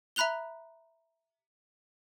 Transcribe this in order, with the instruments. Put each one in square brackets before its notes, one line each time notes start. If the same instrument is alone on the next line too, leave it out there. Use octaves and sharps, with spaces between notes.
[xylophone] E5 A#5 B5 F#6 F7 G7